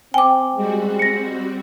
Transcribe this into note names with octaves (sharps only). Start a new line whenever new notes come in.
C4 G5 G#5 D6
G3 G#3 C4 F#4
A#6 C#7